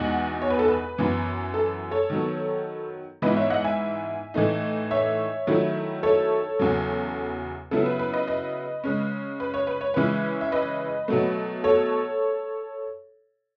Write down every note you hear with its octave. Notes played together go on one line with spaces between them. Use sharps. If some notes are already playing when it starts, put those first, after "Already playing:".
Already playing: E2 B2 G#3 D#4 F#5
C#5
B4
A4
B4
F#2 E3 B3
A4
A4 C#5
D#3 F#3 B3
G#2 E3 B3 E4 B4 D#5
C#5 E5
D#5 F#5
E5 G#5
A2 E3 A3 D#4
C#5 E5
D#3 F#3 A3 E4
A4 C#5
E2 C#3 F#3
C#3 F#3 B3 E4 A4
B4
B4
B4 D#5
B4 D#5
C#3 G#3 C#4
B4
C#5
B4
C#5
C#3 E3 G#3 C#4 E4 B4
E5
B4 D#5
B2 F#3 A3
A4 C#5